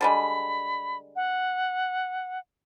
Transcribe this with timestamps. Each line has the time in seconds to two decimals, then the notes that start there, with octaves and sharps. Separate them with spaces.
0.01 D3 G3 G#3 B5
1.16 F#5